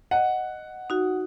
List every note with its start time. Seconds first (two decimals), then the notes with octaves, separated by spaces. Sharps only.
0.11 D#5 F#5
0.90 D#4 F#4